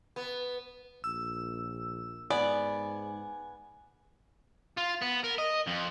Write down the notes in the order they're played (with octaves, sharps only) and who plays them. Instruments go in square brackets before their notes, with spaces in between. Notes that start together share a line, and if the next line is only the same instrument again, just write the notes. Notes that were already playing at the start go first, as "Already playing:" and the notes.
[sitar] B3
[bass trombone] A#1 [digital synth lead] E6
[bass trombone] G#2 [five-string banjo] B3 [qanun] D5 [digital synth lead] G#5
[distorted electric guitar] F4
B3
A#4
D#5
F2